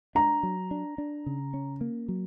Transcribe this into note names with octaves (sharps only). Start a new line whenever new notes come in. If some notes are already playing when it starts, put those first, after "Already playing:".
D4 A#5
F#3
D4
D4
C#3
C#4
A#3
F#3